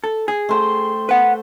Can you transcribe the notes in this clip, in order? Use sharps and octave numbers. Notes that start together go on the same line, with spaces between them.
A4
G#4
A3 C5 G5
B4 F#5